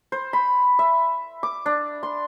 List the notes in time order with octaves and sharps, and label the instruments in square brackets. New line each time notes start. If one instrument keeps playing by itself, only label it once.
[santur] C5
B5
E5
D6
D4
C6